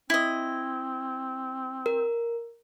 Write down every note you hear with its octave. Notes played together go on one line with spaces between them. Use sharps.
C4 E4 D#5
A#4